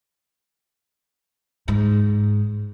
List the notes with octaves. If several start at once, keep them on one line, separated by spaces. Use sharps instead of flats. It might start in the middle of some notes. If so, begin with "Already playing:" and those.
G#2